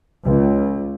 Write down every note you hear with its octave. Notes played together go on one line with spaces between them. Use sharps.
C#2